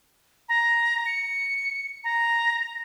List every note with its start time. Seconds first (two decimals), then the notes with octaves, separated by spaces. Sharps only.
0.49 A#5
1.06 C#7
2.04 A#5